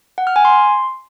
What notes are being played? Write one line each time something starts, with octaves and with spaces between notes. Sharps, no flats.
F#5
F6
G#5
C6